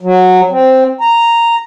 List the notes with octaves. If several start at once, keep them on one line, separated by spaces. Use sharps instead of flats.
F#3
C4
A#5